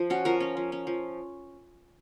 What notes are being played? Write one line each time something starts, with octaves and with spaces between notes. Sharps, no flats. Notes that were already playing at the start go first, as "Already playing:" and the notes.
Already playing: F3
C#4 F#4
F3 A#4
C#4
F3
C#4
F3